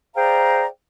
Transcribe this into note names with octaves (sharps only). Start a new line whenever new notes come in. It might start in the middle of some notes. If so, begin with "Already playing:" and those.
G#4 C5 D5 F5 G5 A#5